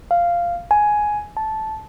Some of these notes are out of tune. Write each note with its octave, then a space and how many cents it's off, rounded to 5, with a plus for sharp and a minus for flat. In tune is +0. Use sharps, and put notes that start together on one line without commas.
F5 -10
G#5 +10
A5 -10